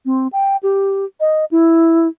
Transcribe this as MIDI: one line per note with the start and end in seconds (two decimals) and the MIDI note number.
0.06 0.28 60
0.33 0.56 79
0.63 1.05 67
1.20 1.45 75
1.51 2.08 64